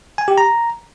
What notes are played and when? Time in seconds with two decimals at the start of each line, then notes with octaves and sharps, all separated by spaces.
0.18 G#5
0.28 G4
0.38 A#5